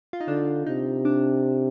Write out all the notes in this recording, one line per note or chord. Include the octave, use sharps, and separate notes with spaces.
F4
D#4
D3 D4
C3 D#4
D4